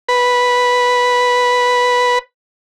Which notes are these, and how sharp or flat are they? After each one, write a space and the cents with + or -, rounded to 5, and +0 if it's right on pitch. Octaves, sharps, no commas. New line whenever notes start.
B4 -5